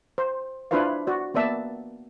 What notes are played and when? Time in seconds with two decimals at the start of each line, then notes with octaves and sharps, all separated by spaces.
0.18 C5
0.71 D4 E4 F4 B4 C5 F5
1.07 F#4 D5
1.34 A#3 B3 D5 E5 A5